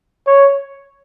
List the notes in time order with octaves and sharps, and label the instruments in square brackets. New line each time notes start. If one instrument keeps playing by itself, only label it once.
[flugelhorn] C#5